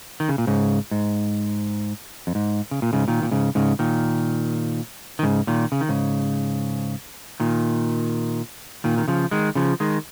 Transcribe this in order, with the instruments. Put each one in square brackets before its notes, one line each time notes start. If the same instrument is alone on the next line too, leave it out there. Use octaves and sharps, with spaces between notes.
[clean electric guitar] D#3
C#3
A#2
G#2 C#3
G#2
F2
G#2
C#3
A#2
G#2 C#3
A#2 D#3
A#2
G#2 C#3
G#2 C#3
A#2 D#3
D#3
G#2 C#3
A#2 D#3
C#3
D#3
G#2 C#3
A#2 D#3
A#2 D#3
D#3
C#3 F3
D#3 G#3
C#3 F3
D#3 G#3